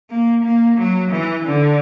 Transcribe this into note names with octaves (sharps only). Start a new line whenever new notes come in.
A#3
A#3
F#3
E3
D3